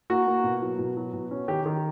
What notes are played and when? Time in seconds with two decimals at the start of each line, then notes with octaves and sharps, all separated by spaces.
0.10 A#3 F#4
0.27 A#3
0.44 B2
0.62 F#3
0.79 B2
0.97 F#3
1.13 B2
1.31 C#4
1.48 D#3 G4
1.66 D#3